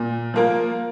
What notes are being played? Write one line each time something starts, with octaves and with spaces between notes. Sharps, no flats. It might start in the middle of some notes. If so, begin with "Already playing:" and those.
Already playing: A#2
F3 A#3 F4 A#4